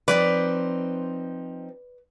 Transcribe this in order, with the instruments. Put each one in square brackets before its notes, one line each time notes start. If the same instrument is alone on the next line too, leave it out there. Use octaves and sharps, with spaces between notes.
[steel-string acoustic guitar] F3 C4 D#4 [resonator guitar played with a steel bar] B4 D5